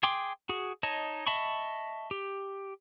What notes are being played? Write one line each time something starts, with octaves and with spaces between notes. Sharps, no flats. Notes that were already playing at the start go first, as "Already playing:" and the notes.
G#4 G5 C6 D6
F#4 G#4
D#4 C#5 D#5 A5
D#5 E5 A5 B5 C#6
G4